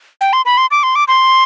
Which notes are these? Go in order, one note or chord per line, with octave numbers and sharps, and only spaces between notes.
G5
C6
B5
C6
D6
C6
D6
C6